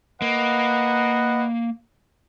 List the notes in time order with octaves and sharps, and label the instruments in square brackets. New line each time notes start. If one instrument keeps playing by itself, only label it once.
[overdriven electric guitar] A#3 [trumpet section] B4 D#5 F#5